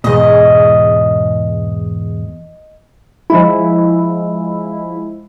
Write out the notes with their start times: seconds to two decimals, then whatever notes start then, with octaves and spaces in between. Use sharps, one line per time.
0.04 E2 G#2 B2 D#5
3.30 F3 G#3 E4